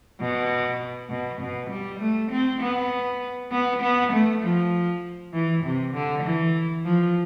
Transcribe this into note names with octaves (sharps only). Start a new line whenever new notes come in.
B2
B2
B2
G3
A3
C4
B3
B3
B3
A3
F3
E3
C3
D3
E3
F3